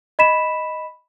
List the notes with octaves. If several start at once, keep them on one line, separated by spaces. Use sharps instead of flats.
D#5 B5 B6 E7